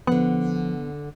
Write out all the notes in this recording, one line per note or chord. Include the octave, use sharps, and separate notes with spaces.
D3 F3 B3 F#5